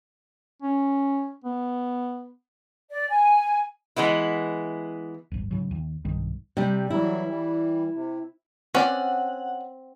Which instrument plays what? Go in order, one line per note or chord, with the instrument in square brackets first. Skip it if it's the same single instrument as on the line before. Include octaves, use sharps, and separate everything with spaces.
[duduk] C#4
B3
[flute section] D5
G#5
[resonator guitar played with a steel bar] E3 G#3 B3 E4
[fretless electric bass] D1 G1
G#2 C#3 F#3
D#2
B1 G2 D#3
[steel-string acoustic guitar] C3 G3
[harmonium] E3 F#3 G3 [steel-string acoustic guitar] E4
[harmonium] E3 G3
C3
[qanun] C4 [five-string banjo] C#4 D5 [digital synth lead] F#5